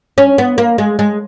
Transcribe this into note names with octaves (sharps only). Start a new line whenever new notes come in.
C#4
B3
A#3
G#3
G#3